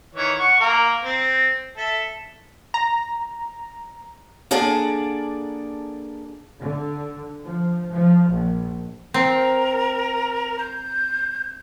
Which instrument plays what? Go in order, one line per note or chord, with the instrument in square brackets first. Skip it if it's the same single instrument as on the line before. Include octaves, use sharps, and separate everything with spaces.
[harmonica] D#3 E3 C#5
F#5 C#6
A#3 A#4
C4
A4 E5
[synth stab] A#5
[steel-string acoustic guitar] A#3 D4 G#4 A4 D5 F#5
[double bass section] D3
F3
F3
A#1
[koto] C4 [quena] A#4
[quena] G6